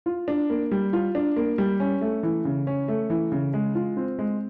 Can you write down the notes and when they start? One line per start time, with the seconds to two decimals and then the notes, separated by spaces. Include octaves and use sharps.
0.06 F4
0.28 D4
0.50 A#3
0.71 G3
0.93 F4
1.15 D4
1.36 A#3
1.58 G3
1.80 C#4
2.01 A3
2.23 E3
2.45 C#3
2.67 C#4
2.88 A3
3.10 E3
3.32 C#3
3.54 G#3
3.75 F4
3.97 C4
4.19 G#3